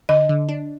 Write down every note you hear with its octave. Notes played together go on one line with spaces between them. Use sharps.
D3 D#5
D3
D4